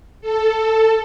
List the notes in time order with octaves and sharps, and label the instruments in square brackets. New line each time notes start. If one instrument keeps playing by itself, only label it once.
[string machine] A4